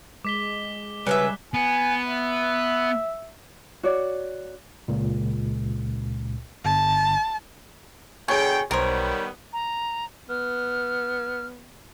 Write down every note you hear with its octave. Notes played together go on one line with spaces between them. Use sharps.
G#3 D6 B6 G7
C#3 G3 A#4 B4 E5 F#6
B3 G#5
E5
F#4 C#5 D5
C#2 A#2
G1 A5
B2 D3 G#4 C#5 G5 G#5 C#6
B1 D#3 G3 B3 A#4 C5 C#5
A#5
B3 F6